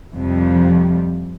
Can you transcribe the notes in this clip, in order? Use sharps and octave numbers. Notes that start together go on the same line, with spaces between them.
F2 C3 F3 G3